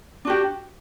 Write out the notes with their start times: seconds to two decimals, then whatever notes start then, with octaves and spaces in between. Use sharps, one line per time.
0.25 D4
0.27 F#4
0.30 G4